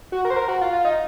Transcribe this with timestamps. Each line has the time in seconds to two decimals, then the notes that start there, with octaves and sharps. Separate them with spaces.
0.12 F#4
0.25 A#4
0.30 C5
0.36 A#4
0.48 F#4
0.61 F4
0.73 F4
0.85 D#4